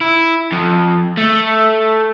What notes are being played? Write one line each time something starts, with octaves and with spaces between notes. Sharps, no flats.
E4
F2
A3